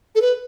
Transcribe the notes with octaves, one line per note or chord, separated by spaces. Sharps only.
A4
B4